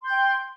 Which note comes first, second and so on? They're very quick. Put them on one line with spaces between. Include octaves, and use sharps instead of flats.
C6 G6 G5